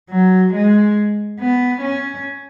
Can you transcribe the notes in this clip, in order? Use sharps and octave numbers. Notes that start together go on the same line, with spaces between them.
F#3
G#3
B3
C#4